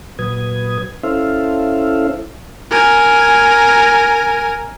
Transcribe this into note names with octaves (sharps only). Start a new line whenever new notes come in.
A#2 F#3 B4 D#6 G#6
C#4 E4 A4 C5 E5 F5
A#4 G#5